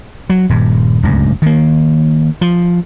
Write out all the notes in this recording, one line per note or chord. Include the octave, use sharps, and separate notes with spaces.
F#3
D#1 G2
D1 C#2 G2
D#3 A#3
F3